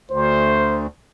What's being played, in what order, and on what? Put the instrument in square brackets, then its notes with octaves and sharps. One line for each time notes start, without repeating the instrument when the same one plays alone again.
[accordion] D2 [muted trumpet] C5